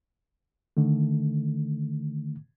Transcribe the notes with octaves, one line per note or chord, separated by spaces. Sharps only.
D3 D#3 A3